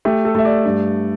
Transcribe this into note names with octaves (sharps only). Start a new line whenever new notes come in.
A3 G4
A4
A3 E5
D5
G2